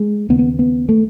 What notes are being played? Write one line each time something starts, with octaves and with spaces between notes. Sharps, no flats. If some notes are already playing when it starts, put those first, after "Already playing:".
Already playing: G#3
D#2 C#3 B3
B3
B3
A3